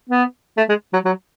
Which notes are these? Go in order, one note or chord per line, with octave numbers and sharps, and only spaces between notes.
B3
A3
G#3
F#3
F#3